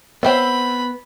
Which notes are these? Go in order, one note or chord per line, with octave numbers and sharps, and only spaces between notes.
B3 C4 C5 C#5 D#5 E5 G5 B5